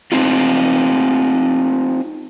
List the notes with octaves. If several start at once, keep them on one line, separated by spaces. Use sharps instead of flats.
C4 D#4 F4